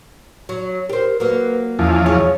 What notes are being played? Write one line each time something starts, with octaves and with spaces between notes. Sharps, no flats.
F#3
G4 A#4 C5
F#3 A#3 B4
E2 F3 C#4
C#4 G#4